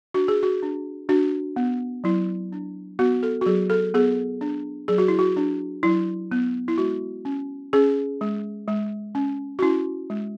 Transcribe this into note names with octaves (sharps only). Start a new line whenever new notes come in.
D4 F#4
G#4
F#4
D4
D4 F#4
B3
F#3 E4
D4
B3 F#4
A4
F#4
F#3 G#4
A4
B3 G#4
D4
F#3 G#4
F#4
E4
F#4
D4
F#3 E4
B3
E4
G#3 F#4
C#4
C#4 G#4
G#3
G#3
C#4
F#4
C#4 E4
G#3